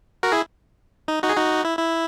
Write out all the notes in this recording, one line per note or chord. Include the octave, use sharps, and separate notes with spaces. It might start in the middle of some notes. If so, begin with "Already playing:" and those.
F#4 A#4
E4 G#4
D#4
D#4 F#4
G#4
D#4 F#4
E4
E4